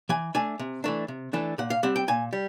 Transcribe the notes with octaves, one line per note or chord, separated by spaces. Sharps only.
E3 G#5
A3 D4 G#5
C3
E3 A3 D4
C3
E3 A3 D4
A#2 F#5
F5
G3 C4 F#5
G5
A#2 G#5
G3